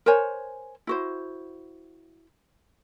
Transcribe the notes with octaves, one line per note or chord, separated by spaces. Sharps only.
A#4 C5 C#5 G#5
E4 F#4 C5